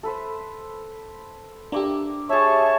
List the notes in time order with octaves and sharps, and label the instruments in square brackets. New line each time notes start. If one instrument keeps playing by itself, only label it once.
[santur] A4 B4 C5
[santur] A#3 D6 E6 [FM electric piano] D4 G4
[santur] G#4 E5 [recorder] C#5 [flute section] A5 C#6